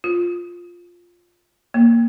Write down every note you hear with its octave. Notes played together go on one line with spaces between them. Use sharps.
F4
A#3